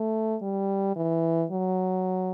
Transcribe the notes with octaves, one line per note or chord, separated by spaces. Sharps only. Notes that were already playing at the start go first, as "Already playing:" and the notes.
Already playing: A3
G3
E3
F#3